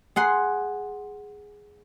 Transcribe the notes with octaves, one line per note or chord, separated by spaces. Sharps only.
G#4 F#5 C6